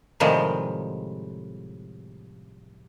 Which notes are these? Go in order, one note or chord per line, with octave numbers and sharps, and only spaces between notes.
A2 C3 D#3 F3 G3 G#3